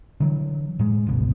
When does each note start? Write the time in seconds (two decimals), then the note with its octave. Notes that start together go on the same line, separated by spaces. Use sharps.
0.20 D3 E3 F#3
0.79 A2 G#3
1.07 G1 C#2 B2